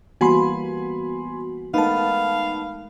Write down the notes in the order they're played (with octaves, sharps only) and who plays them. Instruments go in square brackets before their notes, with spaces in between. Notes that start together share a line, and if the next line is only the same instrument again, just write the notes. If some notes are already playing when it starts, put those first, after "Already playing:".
[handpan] E3 G3 A#3 [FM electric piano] B3 F#4 [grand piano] G#5 B5 C6
[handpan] G#3 A3 A#4 [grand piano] B3 [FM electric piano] D#4 A5 [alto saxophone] F5